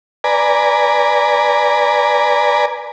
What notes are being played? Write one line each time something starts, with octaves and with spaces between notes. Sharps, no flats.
B4 D5 G#5 A#5